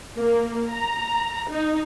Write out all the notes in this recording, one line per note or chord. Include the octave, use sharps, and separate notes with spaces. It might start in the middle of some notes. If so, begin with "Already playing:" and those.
A#3
A#5
D#4